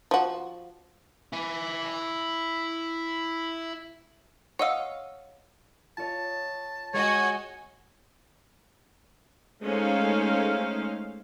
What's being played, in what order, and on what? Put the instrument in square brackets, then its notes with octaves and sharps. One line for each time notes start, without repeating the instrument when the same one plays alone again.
[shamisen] F3 F#4
[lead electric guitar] E4 G#5
[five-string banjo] C#5 D#5 F5 [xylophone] F#5 E6
[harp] F4 C#5 D#5 [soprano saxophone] A5
[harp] G#3 G#4 G5 [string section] F#4 D#5 [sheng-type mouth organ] C#5
[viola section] G#3 A3 C#4 D#4 C5 F5